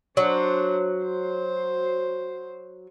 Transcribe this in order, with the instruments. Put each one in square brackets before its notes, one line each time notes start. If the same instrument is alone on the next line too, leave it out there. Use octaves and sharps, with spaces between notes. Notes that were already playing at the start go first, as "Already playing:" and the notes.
[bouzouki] F#3 [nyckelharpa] D4 C5
[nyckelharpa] C5